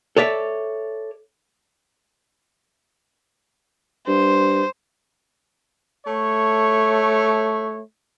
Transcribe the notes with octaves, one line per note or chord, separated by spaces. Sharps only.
A4 C#5 D5 E5
G2 C5
A3 C#5